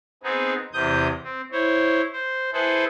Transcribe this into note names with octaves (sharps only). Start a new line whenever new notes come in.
B3 C4 D#4 G#4
E2 C3 D#6 G6
C4
E4 C5 C#5
C5
E4 G#4 A4 B4 C5